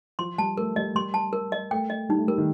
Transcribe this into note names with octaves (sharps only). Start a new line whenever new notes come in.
F3 C6
G3 A5
A3 A#4
G3 D#5
G3 C6
A5
A#4
D#5
A3 G5
D#5
G3 D#4
A3
G3 A#4
D#3